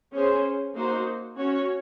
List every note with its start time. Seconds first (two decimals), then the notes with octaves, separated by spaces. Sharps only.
0.12 C#4 G#4 C5
0.74 A#3 D#4 F#4 C5
1.36 C#4 F#4 C#5